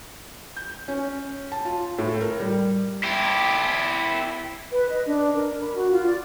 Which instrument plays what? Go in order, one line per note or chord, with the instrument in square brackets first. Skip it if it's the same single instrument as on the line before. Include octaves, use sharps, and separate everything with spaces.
[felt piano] G6
C#4
A5
F4
A2
A#4
G3
[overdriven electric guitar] E4 G4
[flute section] B4
D#5
D4
A#4
B5
F#4
F4
D5